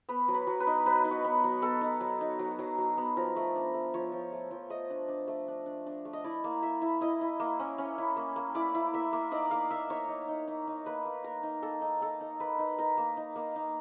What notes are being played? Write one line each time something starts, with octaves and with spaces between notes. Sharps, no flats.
B3 B4
F#3
B4
F#3
B4
D#4
F#3 B4
D#4
F#4
B3
F#3
B3 A4
D#4
F#3
D#4
F#3
F#3
F#3
B3
F3 A#4
A3
D4
A3
F3 C#5
F3
A3
F3
A3 D#5
D4
D4
A3
D4
D4
D4
A3
D#5
E4 D5
A#3
E4 E5
E4
E4 D#5
E4
A#3
C#4
C#4
E4
A#3
A#3
E4 D5
E4
A#3 E5
A#3
D#4 D5
A#3 F5
A#3 E5
D#4 C#5
D#4
D#4
D#4
D#4
A#3 B4
A#3
A#3 A#4
D#4
A#3 A4
D#4
D#4 A4
D#4
A#3 B4
D#4
D#4 A#4
A#3
D#4
A#3
D#4